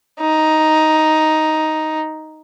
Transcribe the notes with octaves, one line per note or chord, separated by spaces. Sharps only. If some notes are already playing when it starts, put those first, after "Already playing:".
D#4